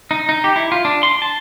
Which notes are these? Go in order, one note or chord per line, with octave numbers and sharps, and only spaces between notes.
D#4
D#4
G4
E4
F4
D4
C6
A5